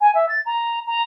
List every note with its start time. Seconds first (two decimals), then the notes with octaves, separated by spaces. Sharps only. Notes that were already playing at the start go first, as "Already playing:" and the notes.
0.01 G#5
0.15 E5
0.29 A6
0.46 A#5
0.87 A#5